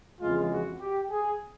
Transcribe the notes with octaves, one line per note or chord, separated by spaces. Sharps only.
F2 C#3 E3 G#3 F4
F#4
G4
G#4